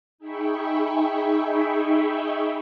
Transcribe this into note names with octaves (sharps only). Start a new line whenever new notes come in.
D#4 G#4 E5 G5 B5 C#6